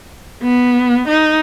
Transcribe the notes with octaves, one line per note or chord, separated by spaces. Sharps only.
B3
D#4